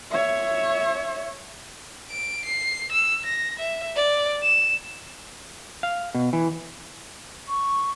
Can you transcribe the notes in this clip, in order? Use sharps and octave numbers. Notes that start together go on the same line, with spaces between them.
C#5 E5
D7
C7
E6
A#6
E5
D5
E7
F5
B2
E3
C#6